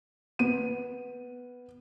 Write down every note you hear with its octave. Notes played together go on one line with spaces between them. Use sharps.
B3 D#7